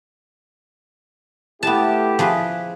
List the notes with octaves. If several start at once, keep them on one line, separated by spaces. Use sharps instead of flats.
A3 B3 E4 G4 A5
F3 G#4 B4